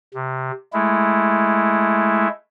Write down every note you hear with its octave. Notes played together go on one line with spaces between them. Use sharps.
C3
G#3 A3 E4